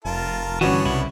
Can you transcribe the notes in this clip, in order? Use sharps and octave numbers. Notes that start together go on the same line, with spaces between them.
F1 F4 A#4 A5
G2 D3 E3 B3 C#4 D4 F#4 C#5
C2 C#3 E4